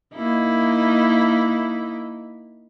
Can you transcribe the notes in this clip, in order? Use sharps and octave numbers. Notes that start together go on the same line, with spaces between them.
A#3 D#4 E4